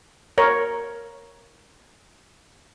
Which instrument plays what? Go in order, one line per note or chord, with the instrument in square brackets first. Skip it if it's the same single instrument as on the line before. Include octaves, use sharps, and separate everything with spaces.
[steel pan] A#4 C#5